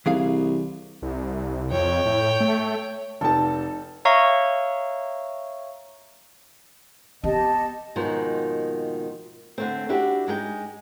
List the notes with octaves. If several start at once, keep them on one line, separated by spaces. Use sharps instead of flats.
C2 E3 G#4 F5
C2
F2 C#5 G5
A2
A3
F1 D#4 A4 A5
C#5 E5 F5 A#5 C#6
B3 G4 D#5 A5
D#2 G#2 B2 D#3 F3
D3 A3 C4
D4 E4 F#4 G4
G#2 G#3 A4 G5